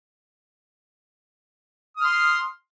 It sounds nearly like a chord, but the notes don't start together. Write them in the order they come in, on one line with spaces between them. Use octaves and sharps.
D#6 F6 C6